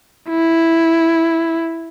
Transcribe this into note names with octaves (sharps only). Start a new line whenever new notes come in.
E4